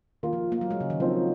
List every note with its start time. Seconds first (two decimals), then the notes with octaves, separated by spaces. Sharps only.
0.23 D#3 A#3 F4 A#4
0.33 F3
0.52 A#3
0.61 F#3
0.70 G#3
0.80 C#3
0.90 D#3
1.00 F3 F#3 C4 D#4